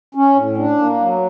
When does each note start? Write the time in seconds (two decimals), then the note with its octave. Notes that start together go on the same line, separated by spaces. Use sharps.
0.15 C#4
0.36 A2
0.57 D4
0.78 A#3
1.00 F#3